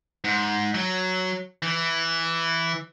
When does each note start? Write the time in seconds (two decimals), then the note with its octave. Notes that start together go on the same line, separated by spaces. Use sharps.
0.24 G#2
0.75 F#3
1.63 E3